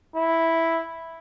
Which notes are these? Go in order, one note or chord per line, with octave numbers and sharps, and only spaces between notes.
E4